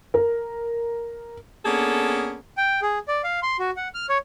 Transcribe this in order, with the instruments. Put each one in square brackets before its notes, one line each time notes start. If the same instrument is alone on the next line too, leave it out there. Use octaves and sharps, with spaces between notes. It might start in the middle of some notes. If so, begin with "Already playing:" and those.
[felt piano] A#4
[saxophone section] A#3 B3 C#4 D4 G#4 A4
[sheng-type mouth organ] G5
G#4
D5
F5
C6
F#4
F#5
F6
C#5